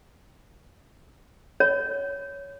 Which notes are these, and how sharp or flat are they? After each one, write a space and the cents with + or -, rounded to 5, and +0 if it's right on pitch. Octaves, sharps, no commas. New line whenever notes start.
C#5 +10